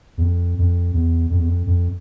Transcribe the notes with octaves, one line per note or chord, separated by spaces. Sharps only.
E2
F2
F2
E2
F2
E2
F2
F2